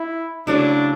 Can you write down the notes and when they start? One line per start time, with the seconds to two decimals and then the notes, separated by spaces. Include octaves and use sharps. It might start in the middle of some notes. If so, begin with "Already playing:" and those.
Already playing: E4
0.47 C#3 F#3 A3 D4 E4